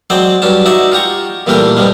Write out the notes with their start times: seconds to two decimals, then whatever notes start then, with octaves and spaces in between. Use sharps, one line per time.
0.10 F#3 G#3 C4 C5 D5
0.42 G2 F#3 C#4 D4 A5
0.66 D#4 F#4 D5 E5
0.92 F4 G4 A#5 C#6
1.47 A#2 E3 G3 A3 G4 A#4
1.77 G2 C3 F3 G3 G#3